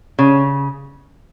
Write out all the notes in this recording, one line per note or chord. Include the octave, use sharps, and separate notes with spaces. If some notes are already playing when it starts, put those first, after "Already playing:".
C#3